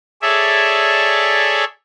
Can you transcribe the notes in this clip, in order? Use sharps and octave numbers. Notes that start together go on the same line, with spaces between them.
G#4 A4 C#5 D5 E5